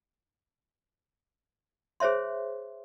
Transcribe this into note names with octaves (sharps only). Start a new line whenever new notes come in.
G#4 C5 C#5 E5 C6